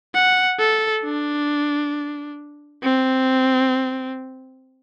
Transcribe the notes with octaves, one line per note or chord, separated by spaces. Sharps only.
F#5
A4
D4
C4